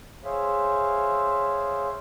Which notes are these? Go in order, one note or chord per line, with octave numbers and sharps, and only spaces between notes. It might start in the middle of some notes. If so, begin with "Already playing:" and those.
G#4 C5 C#5 E5 F5